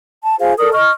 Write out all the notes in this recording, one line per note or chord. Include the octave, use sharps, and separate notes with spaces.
A5
F4 G#4 C5 F5
A4 A#4 D5 D#6
D#5 C#6 F6